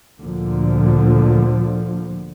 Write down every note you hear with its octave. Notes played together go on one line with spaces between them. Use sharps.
D2 A#2 D3 F3